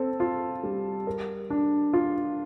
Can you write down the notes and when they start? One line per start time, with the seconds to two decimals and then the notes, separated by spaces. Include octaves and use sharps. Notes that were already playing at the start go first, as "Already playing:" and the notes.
Already playing: C4 A4
0.20 F4
0.64 G3
1.07 A#4
1.50 D4
1.93 F4